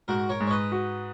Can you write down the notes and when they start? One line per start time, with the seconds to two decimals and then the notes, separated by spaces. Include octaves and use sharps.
0.08 G#2 F#4 A#4
0.29 A#4 C#5
0.40 G#2
0.47 C#5
0.50 B4 D#5
0.72 F#4